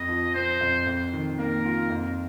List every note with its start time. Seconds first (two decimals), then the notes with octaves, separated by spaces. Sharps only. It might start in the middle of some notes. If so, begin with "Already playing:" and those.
Already playing: F2 D#5
0.09 F3
0.35 C4 C5
0.61 F2
0.87 F2
1.13 D#3
1.38 A#3 A#4
1.65 F4
1.90 F2